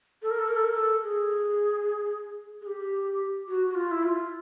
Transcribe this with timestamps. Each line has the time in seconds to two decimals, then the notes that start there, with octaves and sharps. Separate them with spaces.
0.22 A4
0.31 A#4
0.39 A4
0.48 A#4
0.56 A4
0.65 A#4
0.74 A4
1.03 G#4
2.61 G#4
2.67 G4
3.48 F#4
3.67 F#4
3.75 F4
3.91 E4
4.03 F4